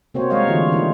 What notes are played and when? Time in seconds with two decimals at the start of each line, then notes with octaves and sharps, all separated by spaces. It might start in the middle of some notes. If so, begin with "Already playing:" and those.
0.14 C3 A#3 C4 F#4 C5 C#5
0.30 G3 G#3 A#4 C#5 D#5 F5
0.47 D3 E3 A3 E4 F4 G4
0.72 D#3 D#4 F4